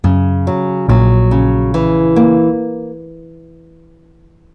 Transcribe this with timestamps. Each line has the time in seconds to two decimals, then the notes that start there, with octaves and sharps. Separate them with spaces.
0.04 F#2 C#3
0.47 F#3
0.89 A#1 A#2 F#3
1.31 C#3
1.74 E3
2.16 A#3